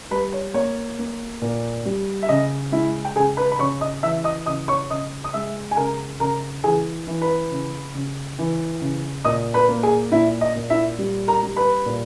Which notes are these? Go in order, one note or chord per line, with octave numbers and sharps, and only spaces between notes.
G3 B4 B5
C#5
A#3 C#5
A#3
A#2
G3
E5
C#3 D#5
G#3 E4 E5
G5
C#3 G#4 G#5
B4 B5
B5
C#3 C#5 C#6
D#5 D#6
E3 E5 E6
D#5 D#6
C#3 D#5 D#6
C#5 C#6
C#3 D#5 D#6
D#6
G#3 E5 E6
G#5
C#3 A#4 A#5
C#3 A#4 A#5
E3 G#4 G#5
E3
B4 B5
C#3
C#3
E3
C#3
A#2 D#5 D#6
B4 B5
A#3
G#4 G#5
A#2 E4 E5
D#5
A#2
E4 E5
G3
A#4 A#5
G3
B4 B5
A#2